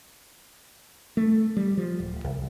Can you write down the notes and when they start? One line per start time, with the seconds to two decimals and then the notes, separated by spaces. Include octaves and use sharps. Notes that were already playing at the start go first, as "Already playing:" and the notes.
1.17 A3
1.57 G3
1.77 F3
2.00 D1
2.24 C2